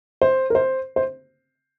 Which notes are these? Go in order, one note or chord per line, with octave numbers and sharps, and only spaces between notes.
C5
A#4
C5
C5